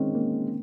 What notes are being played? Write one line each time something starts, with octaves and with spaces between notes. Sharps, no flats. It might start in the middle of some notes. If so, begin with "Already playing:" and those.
Already playing: D#3 G#3 C4 C#4
A#3